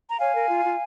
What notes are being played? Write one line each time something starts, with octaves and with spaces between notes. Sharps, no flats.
A#5
C#5 F5 G#5
A#4
F4
F4